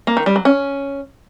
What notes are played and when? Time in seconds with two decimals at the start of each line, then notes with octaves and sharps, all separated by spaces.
0.07 A#3
0.17 D#3
0.26 G3
0.36 F#3
0.45 C#4